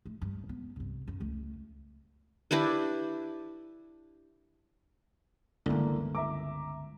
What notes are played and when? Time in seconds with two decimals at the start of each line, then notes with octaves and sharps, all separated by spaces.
0.05 A3
0.22 G2
0.49 B3
0.76 C2 G2
1.08 F#2
1.20 C#2 A3
2.51 D4 E4 G4 B4
5.66 G1 C#2 D3 E3 A#3
6.15 E5 A#5 D6